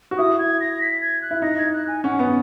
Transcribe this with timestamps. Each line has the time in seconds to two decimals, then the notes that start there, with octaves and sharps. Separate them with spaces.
0.11 F#4
0.18 E4 D#6
0.39 G#6
0.60 A#6
0.81 B6
1.01 G#6
1.22 F#6
1.31 E4
1.42 D#4 A#6
1.58 G#6
1.73 F#6
1.88 G#5
2.04 C#4 F#5
2.19 B3